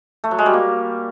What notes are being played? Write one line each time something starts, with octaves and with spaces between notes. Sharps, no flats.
A3
F#3
G#3
G3
A#3